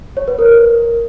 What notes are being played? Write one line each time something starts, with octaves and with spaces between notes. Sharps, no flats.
C#5
B4
A#4